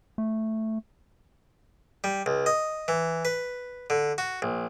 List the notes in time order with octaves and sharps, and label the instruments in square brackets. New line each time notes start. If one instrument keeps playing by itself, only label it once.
[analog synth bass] A3
[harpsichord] G3
C#2
D#5
E3
B4
D3
F#4
A#1